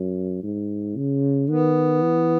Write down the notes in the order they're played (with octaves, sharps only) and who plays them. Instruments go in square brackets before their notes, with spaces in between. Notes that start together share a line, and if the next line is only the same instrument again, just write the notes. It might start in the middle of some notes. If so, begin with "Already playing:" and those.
Already playing: [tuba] F#2
G#2
C#3
[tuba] D#3 [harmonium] B3
[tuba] E3